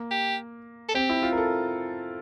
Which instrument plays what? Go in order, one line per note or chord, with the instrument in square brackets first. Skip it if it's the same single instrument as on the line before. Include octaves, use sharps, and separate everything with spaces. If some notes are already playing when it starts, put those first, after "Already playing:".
Already playing: [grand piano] A#3
[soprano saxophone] G4
A4
[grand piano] C4 [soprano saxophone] G4
[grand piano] E4
F4
A#4
A4